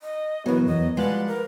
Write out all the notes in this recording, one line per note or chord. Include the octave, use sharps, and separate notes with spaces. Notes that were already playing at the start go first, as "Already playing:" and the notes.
D#5
F#2 B2 E3 F#3 B3
E2 D#5
F3 G3 G#3 B4 F#5 C6 F#6 A6
A#4